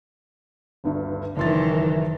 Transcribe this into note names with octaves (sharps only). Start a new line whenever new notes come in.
G1 D2 G2
F#1 D#3 E3 C6 A6